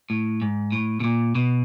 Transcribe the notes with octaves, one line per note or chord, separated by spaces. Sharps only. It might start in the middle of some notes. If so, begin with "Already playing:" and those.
A2
G#2
A2
B2
A#2
B2